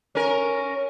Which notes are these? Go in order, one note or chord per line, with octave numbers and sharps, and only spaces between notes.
C#4 A#4